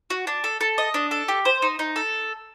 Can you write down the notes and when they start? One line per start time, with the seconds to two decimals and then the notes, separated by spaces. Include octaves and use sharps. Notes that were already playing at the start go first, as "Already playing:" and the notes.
0.10 F#4
0.27 D4
0.44 A4
0.61 A4
0.78 D#5
0.94 D4
1.11 A4
1.28 G4
1.45 C5
1.62 D#4
1.79 D#4
1.96 A4